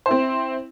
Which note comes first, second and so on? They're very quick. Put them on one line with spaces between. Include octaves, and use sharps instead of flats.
C5 E4 C4